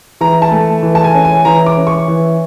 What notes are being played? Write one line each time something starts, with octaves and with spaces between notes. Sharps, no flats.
E3 A#5
A5
A3
E3
A5
G#5
C#4
G#5
E3 A#5
D6
C#4
C#6
E3